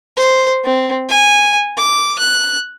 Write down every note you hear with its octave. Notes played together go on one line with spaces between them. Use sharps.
C5
C4
G#5
D6
F#6